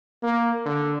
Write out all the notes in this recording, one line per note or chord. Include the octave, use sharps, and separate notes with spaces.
A#3
D3